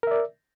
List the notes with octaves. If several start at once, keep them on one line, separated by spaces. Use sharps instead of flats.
A#4 D5 E5